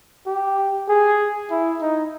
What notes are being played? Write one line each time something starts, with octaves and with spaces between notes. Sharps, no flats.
G4
G#4
E4
D#4